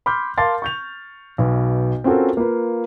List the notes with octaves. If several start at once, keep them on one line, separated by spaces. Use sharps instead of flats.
B5 C6 D6 F6 G6
A#4 F5 A5 C6 D6 A6
C#6 G6 F7
B1 B2
C4 C#4 F4 F#4 A4 A#4
A#3 F4 B4